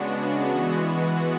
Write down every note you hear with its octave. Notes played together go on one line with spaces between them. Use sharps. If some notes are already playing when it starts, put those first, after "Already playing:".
Already playing: C#3 G#3 B3 D4 F#4
E3 G#3 B3 F#4